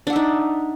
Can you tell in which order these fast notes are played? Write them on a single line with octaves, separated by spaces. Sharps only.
D4 F#5 E5 D#4